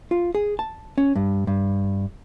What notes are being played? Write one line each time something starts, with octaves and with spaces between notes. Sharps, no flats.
F4
G#4
A5
C#4
G2
G2